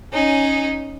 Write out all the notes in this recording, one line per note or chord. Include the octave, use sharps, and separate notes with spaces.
C#4 D#4